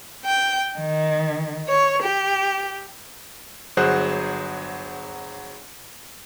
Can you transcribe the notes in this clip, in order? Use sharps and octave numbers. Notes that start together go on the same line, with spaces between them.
G5
D#3
C#5
G4
G1 F#3 G#4 C5 F#5 F#6